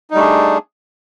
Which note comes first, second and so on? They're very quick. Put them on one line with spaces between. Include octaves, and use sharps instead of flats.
D#4 G3 A3 D4 G#4